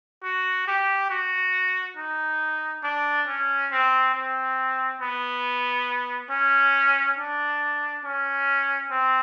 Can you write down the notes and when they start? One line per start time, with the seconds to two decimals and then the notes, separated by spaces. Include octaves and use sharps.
0.24 F#4
0.67 G4
1.10 F#4
1.97 D#4
2.83 D4
3.27 C#4
3.71 C4
4.15 C4
5.02 B3
6.30 C#4
7.18 D4
8.05 C#4
8.91 C4